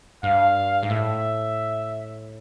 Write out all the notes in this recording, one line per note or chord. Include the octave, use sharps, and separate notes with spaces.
G2 F5
G#2
A2 E5